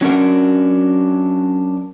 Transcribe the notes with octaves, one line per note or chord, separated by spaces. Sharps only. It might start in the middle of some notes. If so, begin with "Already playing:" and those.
F#3 C#4 D4 A#4 F#5